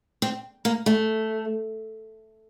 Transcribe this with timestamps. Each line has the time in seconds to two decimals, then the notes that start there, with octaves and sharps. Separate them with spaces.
0.22 C4
0.65 A#3
0.86 A3